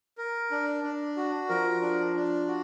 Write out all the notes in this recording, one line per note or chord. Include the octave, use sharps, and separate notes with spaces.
A#4
D4
D4
F#4
F3 A#4
D4
D4
F#4